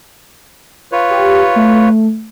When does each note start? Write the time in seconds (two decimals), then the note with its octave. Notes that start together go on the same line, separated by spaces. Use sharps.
0.92 F4 B4 C#5
1.11 G4
1.56 A3